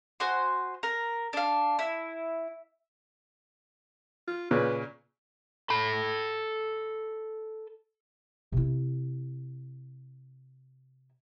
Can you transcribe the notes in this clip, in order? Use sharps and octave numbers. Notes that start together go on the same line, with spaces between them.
F#4 C5 G#5 C6
A#4
D4 F5
E4
F4
A#2 C#3 B4
A4 B5
C3 E4